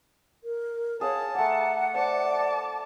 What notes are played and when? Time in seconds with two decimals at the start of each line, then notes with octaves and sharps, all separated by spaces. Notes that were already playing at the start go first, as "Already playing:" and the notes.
0.44 A#4
1.01 G#4 C#5 F5 F#5 A5
1.35 A3 D5 F#5 A#5
1.95 C5 D5 A5 D6